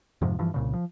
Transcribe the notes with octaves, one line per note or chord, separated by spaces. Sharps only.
F2 G#2 C3 F3
G2 E3 F3
C2 A#2 C#3
F3